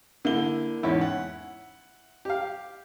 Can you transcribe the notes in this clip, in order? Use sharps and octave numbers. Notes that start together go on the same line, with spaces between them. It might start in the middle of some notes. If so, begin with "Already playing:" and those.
D3 A#3 E4 G7
E2 G#2 C#4 E4
F#5
G4 F5